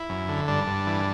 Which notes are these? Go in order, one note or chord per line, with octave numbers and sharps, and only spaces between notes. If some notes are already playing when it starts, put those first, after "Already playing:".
Already playing: E4
F#2
D3
G2 D4
G2
E3